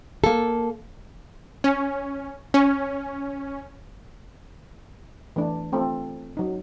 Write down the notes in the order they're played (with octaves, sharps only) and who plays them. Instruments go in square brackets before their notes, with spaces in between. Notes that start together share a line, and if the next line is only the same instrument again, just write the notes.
[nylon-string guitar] A#3 A4
[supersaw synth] C#4
C#4
[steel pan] E3 A3 D4
A3 C4 F4 A4
F#3 D#4